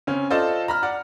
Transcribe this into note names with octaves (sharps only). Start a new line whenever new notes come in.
C#3 C4 C#4
F4 A4 C5 D5 D#5 A5
A#5 B5 F6
D5 F#5